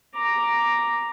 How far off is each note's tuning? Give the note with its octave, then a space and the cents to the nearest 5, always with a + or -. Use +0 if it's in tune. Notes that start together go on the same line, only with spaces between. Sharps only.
A#5 +0 D6 +0